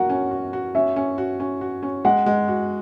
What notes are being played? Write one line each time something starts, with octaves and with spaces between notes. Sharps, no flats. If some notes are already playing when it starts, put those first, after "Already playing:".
Already playing: F#4 A#4 F#5
C#4
F#4
F#4
C#4 E5
C#4
F#4
C#4
F#4
C#4
G#3 F#5
G#3
F#4